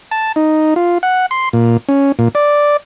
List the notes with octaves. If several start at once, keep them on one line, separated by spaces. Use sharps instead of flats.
A5
D#4
F4
F#5
C6
A#2
C#4
A#2
D5